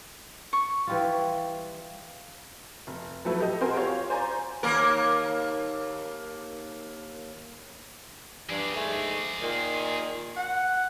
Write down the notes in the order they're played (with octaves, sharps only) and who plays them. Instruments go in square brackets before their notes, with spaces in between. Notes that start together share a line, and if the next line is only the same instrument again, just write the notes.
[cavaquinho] C#6
[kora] E3 G3 F4
[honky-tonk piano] F1
F3 F#3 A3 E4 B4
G4 A4 D#5
C4 F#4 G#4 A#4 G#5 C6
F4 G4 C#5 F5
C5 D5 G#5 A#5 G6
[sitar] D#2 A#3 A#4
[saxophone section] G2 [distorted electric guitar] G#4 D5
[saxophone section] G#2 G#3 A3
A#2 D#3
F#5